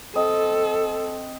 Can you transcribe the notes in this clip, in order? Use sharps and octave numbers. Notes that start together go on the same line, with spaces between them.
C4 A4 D#5